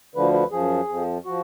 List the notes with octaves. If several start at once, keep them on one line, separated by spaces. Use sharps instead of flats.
D2 D3 F3 B4
B4
F#2 F3 G#4
F2 F3
F3 F#4